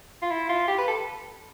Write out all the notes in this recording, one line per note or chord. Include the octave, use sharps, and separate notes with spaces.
F4
E4
F4
G4
B4
A4